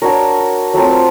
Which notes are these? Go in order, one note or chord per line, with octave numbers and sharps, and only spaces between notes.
D4 F#4 A#4 C#5
F#3 A3 C4 F4